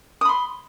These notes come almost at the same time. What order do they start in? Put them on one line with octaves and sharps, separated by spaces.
D#6 B5 C6